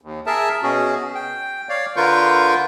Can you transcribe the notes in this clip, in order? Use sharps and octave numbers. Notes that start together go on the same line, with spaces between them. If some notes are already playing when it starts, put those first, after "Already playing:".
D#2
G#4 A#4 E5 A5
B2 C#4 F#4 G#4
G5
C#5 D5 F5
D3 F4 A#4 B4 C#6 G6